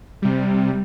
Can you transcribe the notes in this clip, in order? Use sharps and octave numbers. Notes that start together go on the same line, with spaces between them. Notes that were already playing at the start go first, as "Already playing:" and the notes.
C3 G3